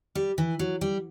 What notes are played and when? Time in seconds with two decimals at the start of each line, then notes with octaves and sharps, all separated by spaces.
0.15 G3
0.38 E3
0.59 F#3
0.81 G3